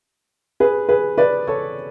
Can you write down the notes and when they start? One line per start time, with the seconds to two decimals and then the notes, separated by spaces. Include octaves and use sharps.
0.60 G#4 B4
0.89 G#4 B4
1.18 B4 D5
1.47 A4 C#5